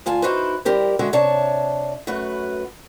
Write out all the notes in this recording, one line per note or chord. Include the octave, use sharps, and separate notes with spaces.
D2 F4 G#5 A5
D#4 E4 F#4 B4 C5
G3 E4 G4 A#4 C5
D3 G#3 F#4 E5
C3 D4 C#5 E5 A5
F#2 A3 F#4 B4